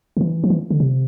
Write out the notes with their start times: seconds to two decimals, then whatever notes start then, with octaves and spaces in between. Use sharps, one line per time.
0.17 D3
0.21 E3
0.44 F3
0.50 E3
0.70 D3
0.80 C3